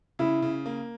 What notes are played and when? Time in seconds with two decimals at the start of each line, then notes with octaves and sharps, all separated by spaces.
0.19 C#3 E4
0.42 C#3
0.66 A#3